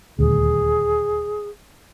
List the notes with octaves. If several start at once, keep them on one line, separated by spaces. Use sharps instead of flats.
D#1 D2 G#4